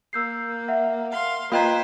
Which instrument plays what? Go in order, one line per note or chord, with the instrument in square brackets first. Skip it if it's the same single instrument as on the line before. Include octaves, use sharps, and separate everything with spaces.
[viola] A#3 [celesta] E6 G6 C7
[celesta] E5 F#5
[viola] F5 C6
[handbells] A#3 G5 G#6 [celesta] F4 D#5 A#5 [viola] B4 C5